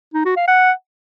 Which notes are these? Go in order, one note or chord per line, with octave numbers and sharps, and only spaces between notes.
D#4
F#4
F5
F#5